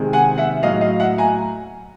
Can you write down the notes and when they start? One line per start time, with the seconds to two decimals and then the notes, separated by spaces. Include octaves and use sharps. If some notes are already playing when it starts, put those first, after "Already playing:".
Already playing: C3 D#3 G#3
0.13 F#5 G#5
0.38 E5 F#5
0.63 A2 F#3 D#5 F5
0.81 D#5 F5
1.00 E5 F#5
1.18 G#5 A#5